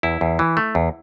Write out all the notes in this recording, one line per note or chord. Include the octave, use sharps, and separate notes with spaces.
E2 E4
E2
E3
A3
E2